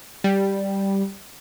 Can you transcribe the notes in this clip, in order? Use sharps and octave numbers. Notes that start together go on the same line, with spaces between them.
G3